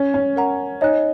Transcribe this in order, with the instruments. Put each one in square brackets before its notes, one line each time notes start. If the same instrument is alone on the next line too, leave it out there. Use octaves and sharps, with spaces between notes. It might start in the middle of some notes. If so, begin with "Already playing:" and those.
Already playing: [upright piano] C#4
C#4
[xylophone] A#4 F#5 A#5
[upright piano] D#4 [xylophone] C#5 G#5 F#6